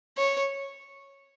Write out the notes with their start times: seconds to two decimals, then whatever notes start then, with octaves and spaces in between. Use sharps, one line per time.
0.18 C#5